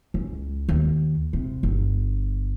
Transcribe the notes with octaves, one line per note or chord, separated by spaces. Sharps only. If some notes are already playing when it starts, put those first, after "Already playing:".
C#2
D#2
C3
G1